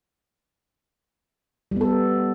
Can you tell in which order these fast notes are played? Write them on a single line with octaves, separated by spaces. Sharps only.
G3 B3 A4